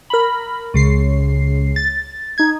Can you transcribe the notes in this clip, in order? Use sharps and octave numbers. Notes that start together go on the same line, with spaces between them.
A#4 B5
C#2 C#3 C7
A6
D#4 G#6